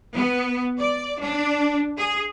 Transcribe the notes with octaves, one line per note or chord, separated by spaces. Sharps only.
B3
D5
D4
G#4